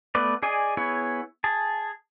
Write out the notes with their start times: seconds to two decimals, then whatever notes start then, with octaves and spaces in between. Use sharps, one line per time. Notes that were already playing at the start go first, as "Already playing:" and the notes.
0.15 A3 B3 B4 D5
0.43 G#4 D5 D#5 G#5
0.77 B3 E4 G#4 C#5
1.44 G#4 A5